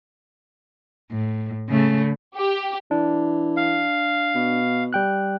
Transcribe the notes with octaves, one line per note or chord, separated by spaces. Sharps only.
A2
C#3 A3
G4
E3 D4
F5
B2
G3 G5 F#6